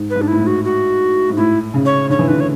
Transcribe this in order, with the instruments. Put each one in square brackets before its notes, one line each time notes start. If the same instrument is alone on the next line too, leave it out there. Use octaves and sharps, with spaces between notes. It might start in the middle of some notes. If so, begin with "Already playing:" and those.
Already playing: [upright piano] G#2
[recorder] B4
[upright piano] G#2
[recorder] D4
[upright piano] A2 [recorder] E4
[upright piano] G#2
[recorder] F#4
F#4
[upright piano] G#2
[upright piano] A2 [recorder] E4
[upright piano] C#3
[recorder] C#5
[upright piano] D3 [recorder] C#5
[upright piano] E3
[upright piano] D3 [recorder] B4
[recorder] C#5